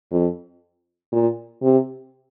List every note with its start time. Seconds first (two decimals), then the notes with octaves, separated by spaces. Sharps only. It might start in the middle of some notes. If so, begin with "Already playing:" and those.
0.11 F2
1.12 A#2
1.62 C3